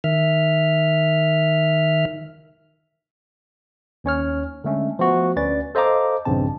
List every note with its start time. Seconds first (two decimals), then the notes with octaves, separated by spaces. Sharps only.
0.04 D#3 E5 F6
4.04 D#2 C#4 C#5 F6
4.64 D3 G#3 A3 C#4
4.99 F3 A3 B3 F#4
5.36 D2 C#4 B4 D5 A6
5.75 A4 C5 D#5 F5 A#5 D6
6.25 A#1 G2 C#3 C4 A5